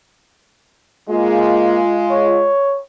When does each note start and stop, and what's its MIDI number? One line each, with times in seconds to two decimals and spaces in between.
1.09 2.52 56
1.09 1.82 58
1.09 2.52 65
2.11 2.81 73